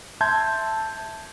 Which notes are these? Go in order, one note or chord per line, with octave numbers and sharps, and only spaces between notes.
E5 A5 C6 G6 G#6